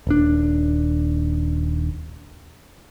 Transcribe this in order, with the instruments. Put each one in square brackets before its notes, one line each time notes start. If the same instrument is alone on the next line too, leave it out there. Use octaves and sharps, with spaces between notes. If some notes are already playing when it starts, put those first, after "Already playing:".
[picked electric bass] D#1 D4